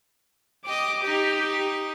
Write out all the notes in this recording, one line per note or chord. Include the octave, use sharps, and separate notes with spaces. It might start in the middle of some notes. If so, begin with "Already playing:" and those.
G4 D#5 D6
D#4 G4